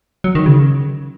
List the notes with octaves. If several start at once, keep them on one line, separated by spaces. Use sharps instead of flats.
F#3
D#3
C#3